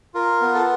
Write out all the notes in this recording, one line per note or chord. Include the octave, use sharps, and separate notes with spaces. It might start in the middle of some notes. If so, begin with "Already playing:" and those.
F4 A#4
B3
A4